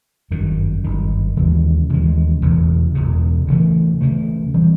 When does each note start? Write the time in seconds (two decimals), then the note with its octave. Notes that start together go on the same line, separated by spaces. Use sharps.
0.31 G1 F#2 D#3
0.84 G1 F#2 D#3
1.37 D#2 C#3 E3 G#3
1.89 D#2 C#3 E3 G#3
2.42 E1 E2 C#3
2.95 E1 E2 C#3
3.48 D2 C#3 E3 A3
4.01 D2 C#3 E3 A3
4.54 E3 G3 C4